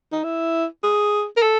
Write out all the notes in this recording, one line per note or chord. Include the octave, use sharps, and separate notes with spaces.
D#4
E4
G#4
A#4
A4